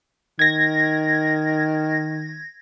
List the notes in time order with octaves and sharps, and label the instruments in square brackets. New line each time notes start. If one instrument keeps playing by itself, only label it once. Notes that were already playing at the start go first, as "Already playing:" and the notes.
[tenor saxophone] D#3 [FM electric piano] G#6 A#6